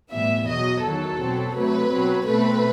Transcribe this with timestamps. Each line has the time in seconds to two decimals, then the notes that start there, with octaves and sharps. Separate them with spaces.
0.11 A2 E3 G3 B3 E5
0.47 E2 B2 F#3 D#5
0.82 E2 D#3 F#3 A4
1.18 B2 F#3 C4
1.55 C3 F#3 A3 B4
1.91 B2 F#3 C4
2.27 B2 A3 C4 B4